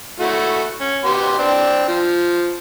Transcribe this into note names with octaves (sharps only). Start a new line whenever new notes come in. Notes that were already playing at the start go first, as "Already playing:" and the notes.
A3 E4 F#4
C#4
B3 G4 C6
C4 D4
F3